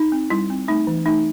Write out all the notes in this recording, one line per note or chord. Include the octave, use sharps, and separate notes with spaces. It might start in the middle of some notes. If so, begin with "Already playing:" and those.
Already playing: D#4
C4
G3 E4
C4
A3 D#4
E3
A3 D#4